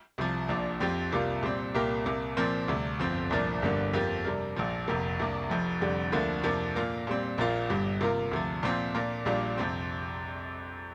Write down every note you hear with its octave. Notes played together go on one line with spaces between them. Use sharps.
C2 C3 F3
A#1 A#2 F3 D4
F2 F3 C4 G4
C2 C3 G3 A#3 F4
A#2 G3 C4
C2 A#2 A#3 G4 A#4
C2 C3 A#3
A#2 F3 C4 A#4
D2 C3 G3
G1 F2 F3 C4
C2 A#2 F3 D4 A#4
G1 G2 D3 A#3 D4
F2 F3 A#3 G4
C3 G3 D4 A#4
A#1 A#2 F3
F1 F2 C3 A#3
C2 C3 A#3 D4
F1 F2 F3
F1 F2 D3 G3
D2 D3 F3 A#3
F2 C3 F3 A#3 D4
A#2 A#3 F4 A#4
A#2 G3 C4
A#1 A#2 A#3 F4
G1 G2 G3
C3 A#3 F4 A#4
D2 C3 F3
A#2 F3 C4 F4
A#2 A#3 D4 A#4
A#1 A#2 G3 D4 F4
F2 C3 F3 C4